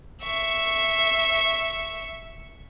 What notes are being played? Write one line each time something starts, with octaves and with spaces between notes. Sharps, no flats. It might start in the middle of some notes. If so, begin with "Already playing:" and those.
E5 C#6